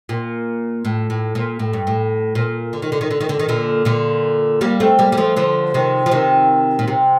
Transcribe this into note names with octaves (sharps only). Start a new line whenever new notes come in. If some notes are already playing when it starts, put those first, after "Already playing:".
A#2
A2
A2
A#2
A2
G2
A2
A#2
D3
D#3
D3
D#3
D3
D#3
D3
D#3
A#2 D3
A#2 D3
G3 A#3
A3 C4
G3 A#3
G3
F3 A3
D3 F3
C3 D#3
F3
C3 D#3
A#2
C3